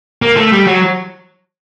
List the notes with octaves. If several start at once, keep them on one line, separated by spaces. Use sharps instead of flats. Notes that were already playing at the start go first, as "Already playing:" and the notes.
A#3
A3
G3
F#3